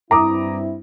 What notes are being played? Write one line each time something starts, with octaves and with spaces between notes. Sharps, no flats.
G2 C4 E4 A#5 D6 D#6